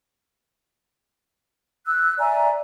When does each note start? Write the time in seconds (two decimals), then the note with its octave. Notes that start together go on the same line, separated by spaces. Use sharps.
1.86 E6 F#6
2.19 D5 E5 G#5 A#5